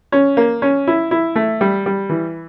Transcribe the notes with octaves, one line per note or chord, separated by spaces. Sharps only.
C#4
A#3
C#4
E4
E4
A3
G3
G3
E3